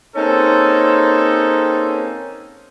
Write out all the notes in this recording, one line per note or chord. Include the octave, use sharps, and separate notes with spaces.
A#3 C4 C#4 D#4 G#4 A4